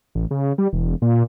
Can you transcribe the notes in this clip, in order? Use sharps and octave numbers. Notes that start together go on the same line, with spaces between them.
A1
C#3
G3
E1
A#2